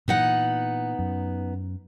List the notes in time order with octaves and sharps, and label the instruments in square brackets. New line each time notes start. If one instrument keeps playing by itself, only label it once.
[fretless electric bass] A#2 E3 [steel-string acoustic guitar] B3 D#4 F#5
[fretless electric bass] F#2